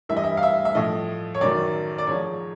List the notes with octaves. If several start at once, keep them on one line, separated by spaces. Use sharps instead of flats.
G2 E3 G3 E5
D#5
E5
F5
E5
E5
A2 F3 D#5
C#5
F#2 D#3 F#3 D5
D5
G#2 F3 C#5